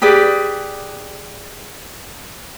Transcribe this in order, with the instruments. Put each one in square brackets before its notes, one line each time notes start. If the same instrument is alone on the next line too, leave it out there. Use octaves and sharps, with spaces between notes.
[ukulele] G4 G#4 B4 D5